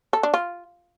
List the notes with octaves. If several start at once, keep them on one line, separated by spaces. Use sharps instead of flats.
A4
D4
F4